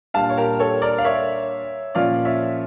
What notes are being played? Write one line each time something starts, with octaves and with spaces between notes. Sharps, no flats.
A#2 G3 D4 F5 A5
C#5
G4 A#4
A4 C#5
A#4 D5
F5
C#5 E5
A#2 F3 C#4 F4 D5 F5
C#5 E5